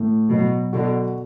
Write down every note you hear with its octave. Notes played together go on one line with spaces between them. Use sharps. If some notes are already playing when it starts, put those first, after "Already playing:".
Already playing: A2
B2 F#3
B2 D3 F#4